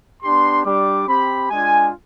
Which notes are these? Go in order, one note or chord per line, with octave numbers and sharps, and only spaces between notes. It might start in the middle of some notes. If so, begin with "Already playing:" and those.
B3 D4 G4 C6
G3 D4 G4 D6
C4 G4 B5
G#3 D4 F4 G#5